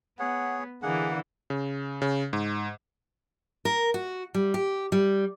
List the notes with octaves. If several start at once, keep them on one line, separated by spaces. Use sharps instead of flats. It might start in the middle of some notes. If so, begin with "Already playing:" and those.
B3 G#4 C#5 F#5
D3 E3 A#3 G#4 F#5
C#3
C#3
G#2
A#4
F#4
G3
G4
G3